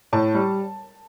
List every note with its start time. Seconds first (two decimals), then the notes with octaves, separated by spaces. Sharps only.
0.13 A2 A5
0.35 G3